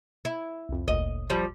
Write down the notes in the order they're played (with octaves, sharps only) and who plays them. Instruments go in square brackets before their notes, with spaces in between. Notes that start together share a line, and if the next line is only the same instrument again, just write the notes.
[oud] E4
[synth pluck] C2 F2
[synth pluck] G1 D2 A#2 [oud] D#5
[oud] F3 G3